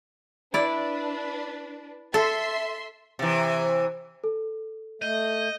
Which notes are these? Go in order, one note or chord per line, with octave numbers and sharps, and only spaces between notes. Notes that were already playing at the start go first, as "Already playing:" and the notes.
D4 E4 B4 D5
A4 E5 C6
C3 E3
A4
A3 D#5 G6